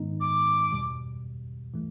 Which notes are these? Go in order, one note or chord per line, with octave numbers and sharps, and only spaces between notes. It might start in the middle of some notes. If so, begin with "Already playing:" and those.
Already playing: G#2 D#3 G#3 B3 D#4
D6
E2 B2 G3
E3 A3